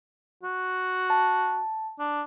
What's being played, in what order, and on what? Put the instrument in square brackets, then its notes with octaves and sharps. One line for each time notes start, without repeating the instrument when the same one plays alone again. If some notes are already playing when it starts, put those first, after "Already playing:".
[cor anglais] F#4
[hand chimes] A5
[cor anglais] D4